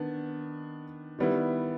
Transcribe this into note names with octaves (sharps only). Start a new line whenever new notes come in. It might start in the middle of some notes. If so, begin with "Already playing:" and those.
Already playing: D#3 B3 D4
D#3 G3 B3 E4